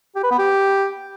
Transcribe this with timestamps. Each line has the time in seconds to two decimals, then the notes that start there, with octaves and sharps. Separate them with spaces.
0.16 G4
0.23 B4
0.31 B3
0.39 G4